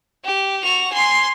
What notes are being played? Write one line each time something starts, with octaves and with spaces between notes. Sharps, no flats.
G4
F#4 F7
G#5 C6